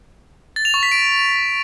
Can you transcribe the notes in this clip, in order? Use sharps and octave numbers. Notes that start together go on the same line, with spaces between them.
A6
F7
C#6
B6
D7